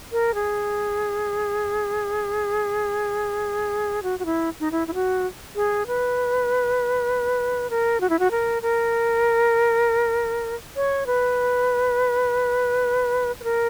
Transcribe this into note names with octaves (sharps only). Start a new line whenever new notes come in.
A#4
G#4
F#4
F#4
E4
D#4
E4
E4
F#4
G#4
B4
A#4
F#4
E4
F#4
A#4
A#4
C#5
B4
B4
A#4